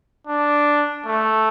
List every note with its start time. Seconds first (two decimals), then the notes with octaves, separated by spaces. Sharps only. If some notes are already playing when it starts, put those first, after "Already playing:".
0.27 D4
1.06 A3